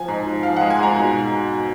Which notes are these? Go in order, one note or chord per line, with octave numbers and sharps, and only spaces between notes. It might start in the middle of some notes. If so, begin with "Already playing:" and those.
Already playing: F3 G#5
G#2
F3
F3 F5
F#5
G#3
G#5
G#2 A#5
B2 G#5